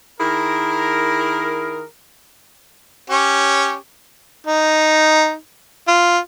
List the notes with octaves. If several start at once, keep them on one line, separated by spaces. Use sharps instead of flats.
D#3 E4 G#4 A#4
C#4 G4 C#5
D#4
F4